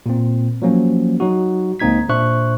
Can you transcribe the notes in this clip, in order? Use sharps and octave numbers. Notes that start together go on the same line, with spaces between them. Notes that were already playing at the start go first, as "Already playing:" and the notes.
A#2 C4
F3 F#3 A#3 C#4
F#3 D#4 F#4
C#2 A#3 C4 D#4 G#6 B6
A#2 D4 C5 E5 C#6 F#6